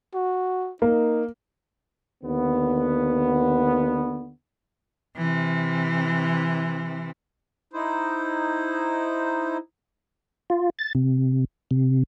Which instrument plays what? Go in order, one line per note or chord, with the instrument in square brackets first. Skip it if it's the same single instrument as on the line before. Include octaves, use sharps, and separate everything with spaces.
[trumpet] F#4
[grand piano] A#3 [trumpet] D#4
[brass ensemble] D#2 D3 B3
[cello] C3 E3
[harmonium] D#4 E4 C5
[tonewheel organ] F4
A6
C3
C3